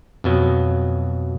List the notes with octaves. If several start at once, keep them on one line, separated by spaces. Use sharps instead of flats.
F2 B2 F#3